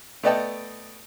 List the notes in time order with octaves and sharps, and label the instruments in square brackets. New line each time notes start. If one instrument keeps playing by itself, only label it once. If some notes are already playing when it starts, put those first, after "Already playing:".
[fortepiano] A3 B3 D5 D#5 G5 A5